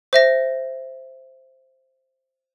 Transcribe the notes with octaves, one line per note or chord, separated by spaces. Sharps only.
C5 E5 A#6